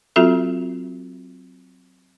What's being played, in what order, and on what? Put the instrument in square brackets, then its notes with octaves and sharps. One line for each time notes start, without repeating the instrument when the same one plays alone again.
[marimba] F#3 C4 F4 F#4 A4 E5